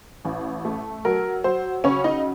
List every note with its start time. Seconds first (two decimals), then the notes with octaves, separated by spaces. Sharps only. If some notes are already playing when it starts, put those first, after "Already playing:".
0.25 A1
0.65 A3
1.05 F#3 A#4
1.44 F#3 C5
1.84 C#3 C#4 C#5
2.04 D#4 D#5